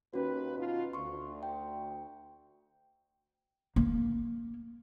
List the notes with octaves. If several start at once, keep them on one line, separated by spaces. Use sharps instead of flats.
D#2 C#4 F#4 B4
B2 D#4 F4
D2 C6 C#6
G5
A#3